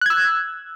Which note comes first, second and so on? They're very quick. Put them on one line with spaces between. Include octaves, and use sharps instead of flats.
F#6 G#6 E6